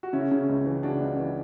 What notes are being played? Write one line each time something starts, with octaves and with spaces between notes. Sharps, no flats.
F#4
C#3 C#4 E4
C#3
C#2
E3
C#3 D4 F#4
C#2
E3